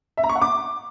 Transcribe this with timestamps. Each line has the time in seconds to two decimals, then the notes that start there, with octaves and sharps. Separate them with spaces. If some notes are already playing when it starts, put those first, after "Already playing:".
0.17 E5
0.23 A#5
0.29 C#6
0.35 F#5
0.42 D6